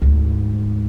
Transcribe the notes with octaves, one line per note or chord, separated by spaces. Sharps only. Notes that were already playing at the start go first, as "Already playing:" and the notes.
D2 G#2